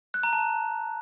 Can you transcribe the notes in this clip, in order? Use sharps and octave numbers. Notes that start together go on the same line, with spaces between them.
F#6
A#5
A5